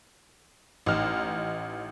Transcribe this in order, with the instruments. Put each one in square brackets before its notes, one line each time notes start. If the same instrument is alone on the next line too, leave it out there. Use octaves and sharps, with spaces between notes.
[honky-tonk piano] A1 D#4 F6